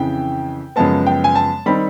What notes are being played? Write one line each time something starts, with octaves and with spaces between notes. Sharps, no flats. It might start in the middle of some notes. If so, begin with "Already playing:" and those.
Already playing: F2 C#3 E3 G5
F#2 C#3 F3 G#3 B3 A5
G5
G#5
A5
D#3 G3 C4 D#4 B5